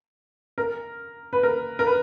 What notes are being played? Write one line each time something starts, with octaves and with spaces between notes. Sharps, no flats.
A#4
B4
A#4
A#4
B4